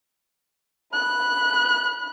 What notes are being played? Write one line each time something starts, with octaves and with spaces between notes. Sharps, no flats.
B5 F#6